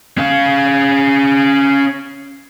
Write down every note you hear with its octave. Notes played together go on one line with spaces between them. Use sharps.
C#4 F5